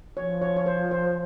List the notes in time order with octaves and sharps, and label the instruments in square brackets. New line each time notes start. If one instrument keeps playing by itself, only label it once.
[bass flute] F3 [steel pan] C#5
[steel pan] C#5
C#5
C5
C5